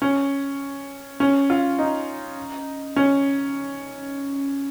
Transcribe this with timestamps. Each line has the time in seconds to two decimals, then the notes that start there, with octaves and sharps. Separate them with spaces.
0.02 C#4
1.20 C#4
1.50 F4
1.79 D#4
2.96 C#4